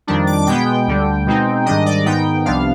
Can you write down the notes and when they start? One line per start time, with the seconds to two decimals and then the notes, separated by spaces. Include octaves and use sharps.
0.07 F2 D#3 G3 D4
0.27 D6
0.47 B2 G#3 B3 G5
0.87 D2 D3 G3
1.26 B2 G#3 C4 D#4
1.66 G#2 D#3 G3 D4 D#5
1.86 D5
2.06 G#2 D#3 B3 D#4 G5
2.46 C2 C3 F3 B3 D4 F5